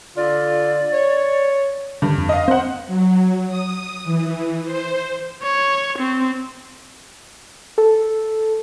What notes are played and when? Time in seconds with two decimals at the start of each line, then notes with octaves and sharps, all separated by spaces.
0.17 D3 F4 D5
0.93 C#5
2.02 G2 D3 D#3
2.17 F2
2.29 D#5 F5
2.48 C4 C5 F#5
2.87 F#3
3.48 D#6
4.04 E3
4.65 C5
5.43 C#5
5.99 C4
7.78 A4